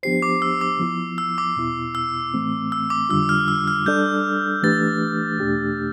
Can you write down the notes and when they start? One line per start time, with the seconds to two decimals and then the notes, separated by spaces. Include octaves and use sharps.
0.03 F3 B3 D4 G4 C5 C7
0.22 D6
0.42 E6
0.61 D6
0.79 F3 B3 E4
1.18 E6
1.38 D6
1.56 E2 B2 B3 E4
1.95 E6
2.34 A2 E3 A3 C4
2.72 E6
2.90 D6
3.09 F2 D3 G3 D4 F4 E6
3.29 F6
3.48 E6
3.68 F6
3.86 G3 D4 A4 D5 G6
4.63 E3 A3 D4 G4 B4 A6
5.40 E2 B2 A3 D4 G4